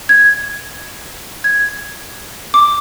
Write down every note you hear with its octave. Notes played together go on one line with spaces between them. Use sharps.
G#6
G#6
D6